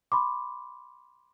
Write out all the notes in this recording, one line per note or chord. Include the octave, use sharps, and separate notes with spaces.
B5 C6 D6